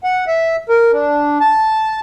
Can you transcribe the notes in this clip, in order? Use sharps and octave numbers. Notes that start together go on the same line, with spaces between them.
F#5
E5
A#4
D4
A5